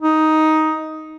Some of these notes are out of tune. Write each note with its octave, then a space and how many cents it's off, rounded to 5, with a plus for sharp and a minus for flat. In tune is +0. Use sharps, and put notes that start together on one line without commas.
D#4 +10